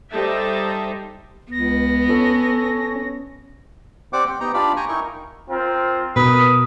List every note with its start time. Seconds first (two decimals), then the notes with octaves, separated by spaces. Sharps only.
0.12 G3 D#4 A4 C5 E5 A5
1.52 C#2 B3 A#6
2.10 C#4 A4
4.13 C4 G4 C5 D5 F#5 D6
4.26 G5
4.40 B3 D#4 G4 G5 A#5
4.54 D4 F4 G4 D5 F5 B5
4.77 G5 G#5 A#5 C#6
4.88 D#4 E4 A#4 C#6
5.50 C4 F4 A#4
6.16 B2 A#4 B4 D#6